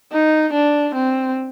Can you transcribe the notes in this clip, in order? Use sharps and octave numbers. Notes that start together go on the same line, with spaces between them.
D#4
D4
C4